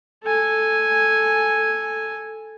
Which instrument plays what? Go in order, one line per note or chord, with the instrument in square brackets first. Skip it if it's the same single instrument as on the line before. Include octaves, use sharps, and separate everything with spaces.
[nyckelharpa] A4 G#5